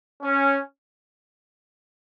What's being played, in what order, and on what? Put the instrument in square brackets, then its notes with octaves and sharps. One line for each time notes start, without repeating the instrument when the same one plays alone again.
[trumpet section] C#4